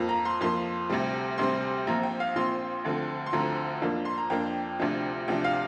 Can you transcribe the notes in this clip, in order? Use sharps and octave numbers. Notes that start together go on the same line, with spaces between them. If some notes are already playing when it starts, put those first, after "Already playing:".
Already playing: F2 F3 A#3
A#5
C6
F2 F3 A#3 C6
D2 C3 G3 C4
D2 C3 G3 C4 C6
A#1 A#2 F3 C4 A#5
G5
F5
A#1 A#2 F3 C4 C6
D2 D3 F3 C4
C6
D2 D3 F3 C4 A#5
F2 F3 A#3 D4
C6
A#5
F2 F3 A#3 D4 G5
D2 C3 F3 D4
D2 C3 F3 D4 G5
F5